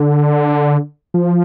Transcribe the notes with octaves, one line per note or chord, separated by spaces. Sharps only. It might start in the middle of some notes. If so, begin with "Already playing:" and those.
Already playing: D3
F3